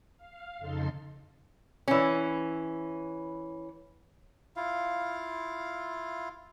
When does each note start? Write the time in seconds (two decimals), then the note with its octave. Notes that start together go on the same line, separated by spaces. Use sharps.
0.17 F5
0.58 F2 C#3 D#4 A4 C6
1.88 E3 C#4
4.56 E4 F4 F5